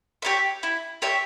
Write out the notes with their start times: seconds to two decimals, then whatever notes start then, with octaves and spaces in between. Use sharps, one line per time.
0.22 G4 C#5 E5
0.63 E4
1.02 G4 C#5 E5